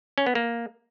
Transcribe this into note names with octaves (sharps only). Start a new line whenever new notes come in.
C#4
B3
A#3